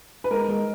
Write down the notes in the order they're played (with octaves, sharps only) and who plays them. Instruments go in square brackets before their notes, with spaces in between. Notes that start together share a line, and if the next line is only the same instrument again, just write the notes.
[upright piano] B4
G#3 A#4
G#3